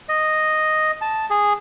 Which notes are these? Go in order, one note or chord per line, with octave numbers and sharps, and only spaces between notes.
D#5
A5
G#4